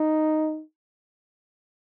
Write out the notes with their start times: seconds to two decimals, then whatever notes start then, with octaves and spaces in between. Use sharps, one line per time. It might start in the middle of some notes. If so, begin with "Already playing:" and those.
Already playing: D#4